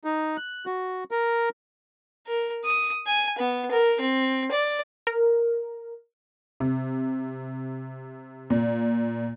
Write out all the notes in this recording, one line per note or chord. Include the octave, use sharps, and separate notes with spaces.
D#4
F#6
F#4
A#4
A#4
D#6
G#5
B3
A#4
C4
D5
A#4
C3
A#2